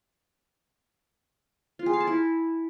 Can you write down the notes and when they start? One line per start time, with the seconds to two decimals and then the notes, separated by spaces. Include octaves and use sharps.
1.79 F4
1.86 G#4
1.93 F5
2.00 A5
2.07 E4